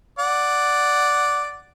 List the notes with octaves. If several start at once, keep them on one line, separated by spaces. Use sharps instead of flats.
D5 F#5